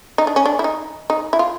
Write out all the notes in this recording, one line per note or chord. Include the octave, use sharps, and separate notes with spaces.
D#4
D4
C#4
D4
E4
D#4
D#4
E4
F4